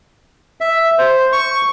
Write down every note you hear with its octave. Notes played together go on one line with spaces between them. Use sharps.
E5
C5
C#6